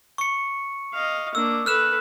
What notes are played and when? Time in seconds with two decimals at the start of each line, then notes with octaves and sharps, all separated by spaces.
0.18 C#6 C#7
0.94 D#5 F5
1.35 A#3 D4 E6
1.66 A4 B4 F6 F#6 E7